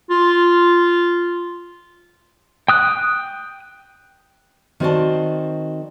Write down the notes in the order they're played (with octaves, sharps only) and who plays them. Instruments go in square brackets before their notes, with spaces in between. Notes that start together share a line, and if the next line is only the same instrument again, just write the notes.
[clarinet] F4
[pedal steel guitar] G5 D#6 F#6
[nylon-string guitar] D#3 C4 F#4 C5 D5 A5